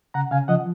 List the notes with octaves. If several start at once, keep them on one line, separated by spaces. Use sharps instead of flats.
C#3 F#5 A#5
C#3 F5 G#5
F3 D#5 F#5